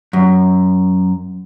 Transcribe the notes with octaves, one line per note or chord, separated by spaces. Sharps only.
F#2